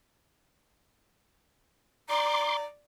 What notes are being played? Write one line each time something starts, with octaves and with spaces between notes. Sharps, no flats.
D5 A#5 C6 D6